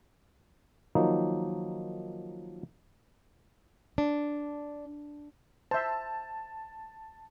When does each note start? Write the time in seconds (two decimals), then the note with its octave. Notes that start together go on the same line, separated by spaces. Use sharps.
0.95 D#3 F3 F#3 A#3 D#4
3.98 D4
5.71 C5 E5 A5